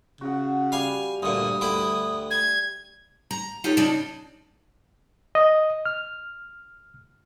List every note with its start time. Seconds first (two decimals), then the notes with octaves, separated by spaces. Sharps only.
0.21 C#3 F#4 F#5
0.72 G3 F5 G#5
1.22 D2 G2 A#2 D#6
1.61 D2 E4 G5
2.31 G#6
3.31 A#5
3.64 D#4 F4 G4 A4 C#5
3.77 C#3 F3 G#3 D4 D#4
5.35 D#5
5.86 F6